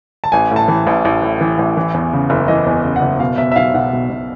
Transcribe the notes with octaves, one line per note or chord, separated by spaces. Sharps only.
A5
A1 G#5
A2 A5
E3
A1
A1
A2
E3
A1
E3
E2
C#3
F#1
E3 D#5
E2
C#3
F#5
F#1
B2 F5
B2 E5
E5
B1 F5
B1 F#5
B2
B2